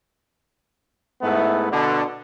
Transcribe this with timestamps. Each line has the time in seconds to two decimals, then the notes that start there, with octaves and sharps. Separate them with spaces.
1.22 G#2 A3 B3 E4
1.72 B2 D3